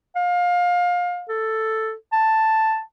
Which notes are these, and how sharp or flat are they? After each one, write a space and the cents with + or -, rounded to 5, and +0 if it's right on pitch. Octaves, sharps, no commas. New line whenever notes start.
F5 +25
A4 +5
A5 +5